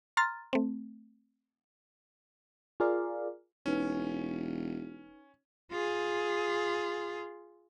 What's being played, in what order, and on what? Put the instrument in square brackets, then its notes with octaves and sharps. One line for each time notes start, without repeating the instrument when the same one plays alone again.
[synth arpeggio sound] A#5 C6 F6 A6
A3 C4
[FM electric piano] F4 G#4 A#4 D5 F5
[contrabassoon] E1 [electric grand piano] C#4 [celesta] D#4 B4
[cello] F4 G#4